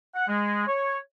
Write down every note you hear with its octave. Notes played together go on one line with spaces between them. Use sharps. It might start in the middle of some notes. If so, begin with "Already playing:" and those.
F#5
G#3
C#5